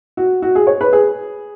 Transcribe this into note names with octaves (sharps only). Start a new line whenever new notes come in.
F#4
F#4
G#4
C#5
B4
G#4